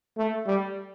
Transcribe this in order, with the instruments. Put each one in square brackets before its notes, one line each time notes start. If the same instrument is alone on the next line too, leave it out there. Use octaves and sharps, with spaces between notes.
[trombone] A3
G3